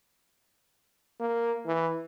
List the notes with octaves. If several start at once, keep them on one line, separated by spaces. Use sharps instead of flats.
A#3
E3